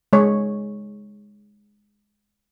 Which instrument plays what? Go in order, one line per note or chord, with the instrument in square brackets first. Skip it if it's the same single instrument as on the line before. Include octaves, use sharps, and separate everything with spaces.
[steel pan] G#3 C#5